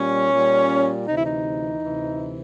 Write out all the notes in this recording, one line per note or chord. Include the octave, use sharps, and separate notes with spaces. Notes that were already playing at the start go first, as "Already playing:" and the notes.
Already playing: A#2 G3 C#4
A#2 G3
D2 C3 E3 D#4
E4
D#4
D2 C3 E3